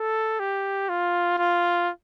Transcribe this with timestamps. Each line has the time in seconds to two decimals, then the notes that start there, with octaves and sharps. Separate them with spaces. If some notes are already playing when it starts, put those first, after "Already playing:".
Already playing: A4
0.40 G4
0.89 F4
1.39 F4